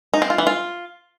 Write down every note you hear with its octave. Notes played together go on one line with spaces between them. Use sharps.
D#4
C4
F4
E3
F4